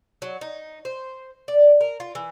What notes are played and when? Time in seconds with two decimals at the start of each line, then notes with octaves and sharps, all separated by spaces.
0.22 F#3
0.41 D#4
0.85 C5
1.48 D5
1.81 A#4
2.00 F4
2.15 E3